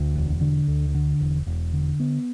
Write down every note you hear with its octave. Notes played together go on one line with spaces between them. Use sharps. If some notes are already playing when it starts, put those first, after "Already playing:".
Already playing: D2
E1
D3
D2
D3
E1
E1
D3
B3